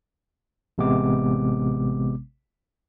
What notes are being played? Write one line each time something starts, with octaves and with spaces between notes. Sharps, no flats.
A1 C3 G#3 B3 D6